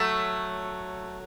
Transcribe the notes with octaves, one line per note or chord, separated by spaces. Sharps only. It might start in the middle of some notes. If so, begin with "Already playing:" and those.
Already playing: F#3 A3